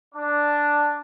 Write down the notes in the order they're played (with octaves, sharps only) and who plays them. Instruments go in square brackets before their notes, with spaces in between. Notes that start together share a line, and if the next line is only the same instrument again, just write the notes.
[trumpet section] D4